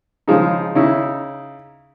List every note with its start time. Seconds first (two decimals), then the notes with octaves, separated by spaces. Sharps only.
0.28 C#3 F3 G#3 D#4
0.75 C#3 D#4 E4